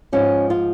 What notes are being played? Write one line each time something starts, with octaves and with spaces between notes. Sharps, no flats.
G#2 F3 C#4
F4